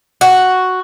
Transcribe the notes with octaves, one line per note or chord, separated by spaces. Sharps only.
F#4